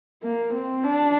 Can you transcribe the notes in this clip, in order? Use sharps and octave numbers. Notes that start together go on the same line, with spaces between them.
A#3
C4
D4